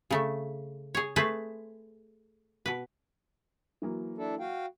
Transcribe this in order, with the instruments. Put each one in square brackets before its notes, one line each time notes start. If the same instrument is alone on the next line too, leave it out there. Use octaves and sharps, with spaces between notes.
[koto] C#3 A3
G#4 C#5
A3 G#4 B4 C5
B2 B4
[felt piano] E3 F#3 A#3
[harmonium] D4 E4 A4
F#4 F5 G5